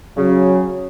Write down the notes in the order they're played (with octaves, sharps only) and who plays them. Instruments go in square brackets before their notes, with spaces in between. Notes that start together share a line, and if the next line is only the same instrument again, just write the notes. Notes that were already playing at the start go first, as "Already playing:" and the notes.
[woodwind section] C#3 [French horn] F#3